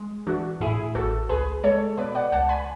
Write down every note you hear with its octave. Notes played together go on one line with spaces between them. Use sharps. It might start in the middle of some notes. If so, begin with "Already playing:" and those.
Already playing: G#3
E3 D4 F#4
A2 E4 G#4
A1 F#4 A4
C#2 G#4 B4
G#3 A4 C#5
B2 B4 D5
D5 F#5
C#2 F#5 A5
G#5 B5